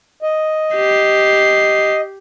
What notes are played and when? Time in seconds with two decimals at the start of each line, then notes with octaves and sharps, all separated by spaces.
0.22 D#5
0.75 G4 C7